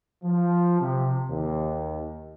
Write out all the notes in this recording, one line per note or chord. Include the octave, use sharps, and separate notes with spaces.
F3
C3
D#2